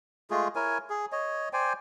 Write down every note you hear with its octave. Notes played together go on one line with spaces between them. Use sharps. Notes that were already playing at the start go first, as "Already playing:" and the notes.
G#3 A3 F4 G#4
E4 A#4 C#5 G#5
G#4
C#5 D#5
C5 D5 G5 G#5